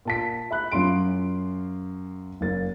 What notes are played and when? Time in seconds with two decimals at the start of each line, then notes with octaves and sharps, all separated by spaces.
0.05 A#2 A5 B6
0.51 E5 B5 F#6
0.71 F#2 C#4 F4 C6 D7
2.41 F#1 A#3 A6